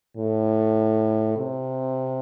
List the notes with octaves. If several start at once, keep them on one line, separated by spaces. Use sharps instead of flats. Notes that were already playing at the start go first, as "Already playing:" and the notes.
A2
C3